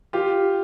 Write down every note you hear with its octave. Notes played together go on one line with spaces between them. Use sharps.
F4 G4